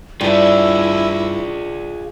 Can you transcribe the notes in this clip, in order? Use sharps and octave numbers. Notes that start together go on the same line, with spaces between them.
G2 G3 E4 F4 G#4